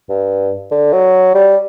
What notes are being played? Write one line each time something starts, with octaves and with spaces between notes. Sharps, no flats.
G2
D3
F#3
G3